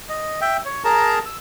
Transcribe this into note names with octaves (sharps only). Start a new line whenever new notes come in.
D#5
E5 G5
C#5
G#4 A#4 A5 A#5
E6